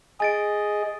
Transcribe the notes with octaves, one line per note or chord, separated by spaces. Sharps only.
G#4 D#5 G#5 A6 D7